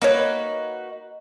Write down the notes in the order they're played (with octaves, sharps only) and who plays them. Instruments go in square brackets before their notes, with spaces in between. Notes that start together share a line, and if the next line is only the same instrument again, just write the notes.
[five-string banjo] A#3 C#5 [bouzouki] D#4 F#4 B4